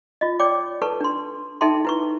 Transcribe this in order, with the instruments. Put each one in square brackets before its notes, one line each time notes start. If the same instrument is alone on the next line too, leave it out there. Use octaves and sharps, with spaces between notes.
[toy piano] F4 D#5
C#5 D5 G5 D6
A4 B4 A5 C#6
D4 C6
D#4 A4 E5 G5 A5 C6
E4 B4 C#6